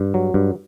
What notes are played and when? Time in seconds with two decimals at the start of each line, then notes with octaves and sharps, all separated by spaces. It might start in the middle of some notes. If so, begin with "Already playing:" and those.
Already playing: G2
0.14 F#3
0.34 G2